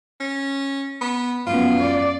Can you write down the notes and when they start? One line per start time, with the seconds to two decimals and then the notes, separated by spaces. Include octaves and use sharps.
0.21 C#4
1.01 B3
1.47 F#2 B3 F4
1.80 D5